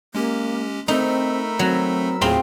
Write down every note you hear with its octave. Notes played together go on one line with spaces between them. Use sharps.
G#3 A#3 C#4 G4
A3 C4 D#4 A4 A#4 B5 E6
F#3 C4
D#2 A2 A3 C4 F4 G#4